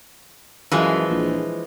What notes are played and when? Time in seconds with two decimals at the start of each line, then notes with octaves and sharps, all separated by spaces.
0.72 F#2 E3 F3 G#3
1.10 A#1